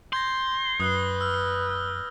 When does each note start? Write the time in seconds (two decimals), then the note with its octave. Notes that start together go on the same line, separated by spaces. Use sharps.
0.13 C6 G6 G#6 A#6
0.80 F#2 B4 D#6 F#6 G7
1.21 E6 F6
1.71 G7